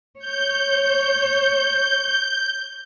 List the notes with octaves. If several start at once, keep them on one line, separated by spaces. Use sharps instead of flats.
C#5 G6